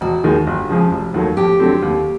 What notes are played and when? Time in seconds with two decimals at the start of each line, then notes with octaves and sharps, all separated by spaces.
0.01 E1 F#4
0.24 D#2 D#3 G#3
0.47 G1
0.69 F2 C#3 F3 G#3
0.91 F1
1.14 D#2 D#3 F#3 A3
1.37 F2 G4
1.60 D3 F#3 A3 C4
1.82 D#2